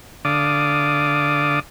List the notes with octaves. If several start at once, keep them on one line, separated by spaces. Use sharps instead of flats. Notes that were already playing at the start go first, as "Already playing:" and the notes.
D3 D5 F5 D6 D#6